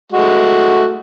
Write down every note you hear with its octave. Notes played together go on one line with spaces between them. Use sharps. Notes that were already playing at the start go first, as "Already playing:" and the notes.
G#3 A3 F#4